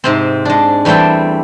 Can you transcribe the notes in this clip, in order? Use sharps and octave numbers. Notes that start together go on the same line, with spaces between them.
G#2 C3 C4
G#3 D4
E2 G3 A3 C4 A4 G5